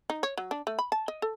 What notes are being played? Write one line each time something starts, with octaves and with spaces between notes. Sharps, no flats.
D#4
C#5
F#3
D4
A3
B5
A5
D#5
A4